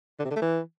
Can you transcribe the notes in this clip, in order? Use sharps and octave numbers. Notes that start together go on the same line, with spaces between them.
D3
C3
D3
A3
E3